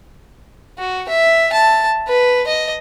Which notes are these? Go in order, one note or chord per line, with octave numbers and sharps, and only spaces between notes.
F#4
E5
A5
B4
D#5